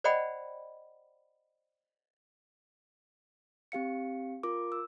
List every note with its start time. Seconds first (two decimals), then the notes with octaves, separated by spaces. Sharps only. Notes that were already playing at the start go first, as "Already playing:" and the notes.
0.04 C5 D5 D#5 F#5 G5 B5
3.72 C4 G4 F5 C#7
4.43 F4 A#4 D6
4.72 E6